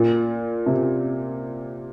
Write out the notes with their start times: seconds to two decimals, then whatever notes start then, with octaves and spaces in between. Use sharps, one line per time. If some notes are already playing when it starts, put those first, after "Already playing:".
Already playing: A#2
0.66 C3